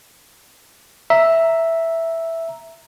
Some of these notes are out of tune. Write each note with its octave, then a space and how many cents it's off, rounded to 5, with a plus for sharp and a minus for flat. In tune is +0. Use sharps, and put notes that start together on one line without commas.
E5 +0 A#5 +0